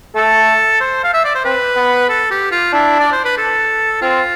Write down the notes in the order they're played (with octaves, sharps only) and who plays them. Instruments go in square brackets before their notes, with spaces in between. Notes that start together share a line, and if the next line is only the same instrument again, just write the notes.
[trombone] A3 [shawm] A4
[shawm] C5
F5
E5
D5
C5
[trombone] C4 [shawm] B4
[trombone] B3
[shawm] A4
G4
F4
[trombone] D4 [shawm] E4
[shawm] D5
C5
B4
A4
[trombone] C4 [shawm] F4